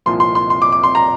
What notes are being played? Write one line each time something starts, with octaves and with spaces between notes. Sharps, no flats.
C2 A#2 F3 C6
C6
C6
C6
D6
D6
C6
A#5